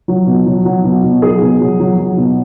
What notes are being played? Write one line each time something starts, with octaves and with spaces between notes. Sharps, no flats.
F#3
B2
F#3
F#3
B2
B2
F#3 G#4
B2
F#3
F#3
F#3
B2